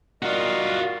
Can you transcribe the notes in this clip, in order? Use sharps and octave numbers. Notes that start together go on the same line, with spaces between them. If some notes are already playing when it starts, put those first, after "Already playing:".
G3 F4 F#4 A#4 D#5